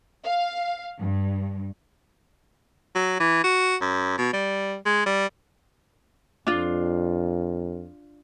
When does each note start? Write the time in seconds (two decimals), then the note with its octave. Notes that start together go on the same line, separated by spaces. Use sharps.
0.24 F5
0.99 G2
2.95 F#3
3.20 E3
3.44 F#4
3.81 F#2
4.18 B2
4.33 G3
4.86 G#3
5.06 G3
6.47 F2 D4 F4